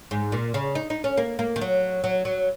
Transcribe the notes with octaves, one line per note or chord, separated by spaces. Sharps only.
G#2
A#2
C#3
D#4
D#4
C#4
A#3
A#3
D#3
F#3
F#3
F#3